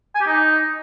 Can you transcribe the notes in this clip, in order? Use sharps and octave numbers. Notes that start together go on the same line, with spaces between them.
G#5
G4
D#4